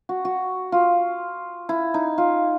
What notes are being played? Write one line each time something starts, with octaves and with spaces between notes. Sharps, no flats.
F#4
F#4
F4
E4
D#4
F4